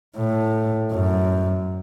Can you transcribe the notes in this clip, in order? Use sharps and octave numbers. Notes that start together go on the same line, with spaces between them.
A2
F#2